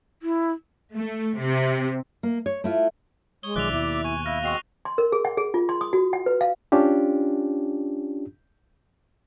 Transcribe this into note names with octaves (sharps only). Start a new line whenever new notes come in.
E4
A3
C3
A#3
C#5
A3 E4 F4
G#3 C#5 D#6 G7
B1 D#3 F3 D5 E5 D6 F#6 F7
D#2 B2 E4
G#5 C#6 D#7
E4 F5 F6 A#6
G#3 C4 F#4 C#6 C7 F7
C6
A#4
G#4
F#5
G#4
F4
C6
D#6
F#4
F#5
B4
F5
C#4 D4 F4 G4